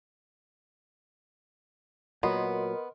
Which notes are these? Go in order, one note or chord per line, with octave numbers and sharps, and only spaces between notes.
A#2 F#3 B3 A#4 D#5 C6